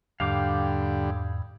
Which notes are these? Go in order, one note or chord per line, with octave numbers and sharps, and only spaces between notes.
E2 G#2 D3 G3 F5 G5 D6